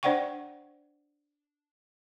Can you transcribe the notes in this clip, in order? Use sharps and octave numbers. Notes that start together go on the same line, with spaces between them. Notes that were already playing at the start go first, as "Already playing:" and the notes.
D4 C5 D5 F#5 G5 C#6